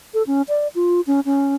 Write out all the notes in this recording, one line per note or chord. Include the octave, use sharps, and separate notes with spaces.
A4
C#4
D5
F4
C#4
C#4